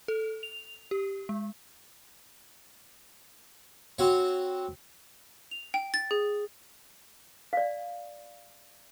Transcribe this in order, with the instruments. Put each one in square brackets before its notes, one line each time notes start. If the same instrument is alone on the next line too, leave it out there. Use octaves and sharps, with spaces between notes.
[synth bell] A4
F7
G4
G#3
[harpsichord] C4 F#4 C#5
[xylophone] F7
G5
A6
G#4
[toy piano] D5 F5